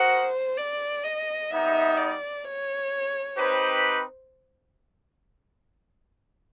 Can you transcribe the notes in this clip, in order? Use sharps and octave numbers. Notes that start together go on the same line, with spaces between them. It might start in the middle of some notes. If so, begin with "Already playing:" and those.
Already playing: F#4 A#4 C5 D#5 F#5
D5
D#5
G3 B3 D#4 E5
D5
C#5
C4 D#4 G4 B4 C5